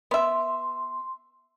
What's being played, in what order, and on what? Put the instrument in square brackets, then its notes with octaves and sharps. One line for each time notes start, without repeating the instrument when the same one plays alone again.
[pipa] B3 E5 [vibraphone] C6